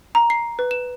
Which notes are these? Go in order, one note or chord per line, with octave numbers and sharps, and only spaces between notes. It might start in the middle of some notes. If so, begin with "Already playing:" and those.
A#5
C7
B4
E7